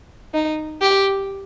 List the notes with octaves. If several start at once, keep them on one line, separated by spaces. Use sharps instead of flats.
D#4
G4